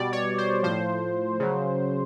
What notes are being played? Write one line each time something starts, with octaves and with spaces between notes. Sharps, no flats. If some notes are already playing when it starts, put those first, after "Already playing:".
Already playing: B2 G3 D5
C#5
C5
A2 F3 C5
C#3 F#3